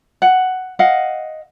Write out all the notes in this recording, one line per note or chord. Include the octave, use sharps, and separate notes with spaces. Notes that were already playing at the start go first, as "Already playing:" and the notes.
F#5
D#5 F5 F#5